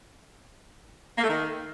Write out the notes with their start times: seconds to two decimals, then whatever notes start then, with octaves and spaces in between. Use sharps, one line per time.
1.17 A#3
1.23 A3
1.29 D#3